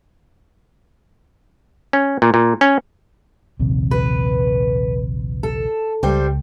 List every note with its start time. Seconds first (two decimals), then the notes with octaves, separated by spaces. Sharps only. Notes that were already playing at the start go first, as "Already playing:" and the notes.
1.93 C#4
2.22 A#2
2.34 A#2
2.61 C#4
3.60 A#1 D#2 C3
3.91 B4
5.43 A4
6.03 C#2 G3 C5 G5